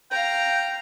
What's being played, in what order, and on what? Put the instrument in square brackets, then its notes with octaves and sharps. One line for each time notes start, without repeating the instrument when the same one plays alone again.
[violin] F5 A#5 [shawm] G5